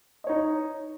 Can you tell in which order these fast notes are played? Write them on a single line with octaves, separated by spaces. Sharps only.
D#5 C#5 D#4